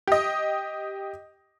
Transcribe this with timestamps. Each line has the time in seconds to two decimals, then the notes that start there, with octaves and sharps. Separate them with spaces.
0.07 G4 D#5